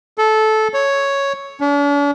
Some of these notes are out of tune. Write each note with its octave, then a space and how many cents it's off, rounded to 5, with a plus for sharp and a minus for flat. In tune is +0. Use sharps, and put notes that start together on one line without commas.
A4 -15
C#5 +0
D4 -45